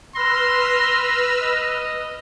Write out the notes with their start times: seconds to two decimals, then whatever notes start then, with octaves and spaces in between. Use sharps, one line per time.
0.15 B4 C6 E6 F6 A#6
1.42 D#5